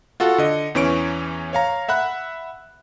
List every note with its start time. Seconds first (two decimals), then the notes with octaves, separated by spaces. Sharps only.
0.20 F4 F#4 A4 F#5
0.38 D3 D#5
0.75 E2 E3 C#4 C#6 D7
1.53 C#5 F5 A#5
1.89 E5 F#5 B5 F#6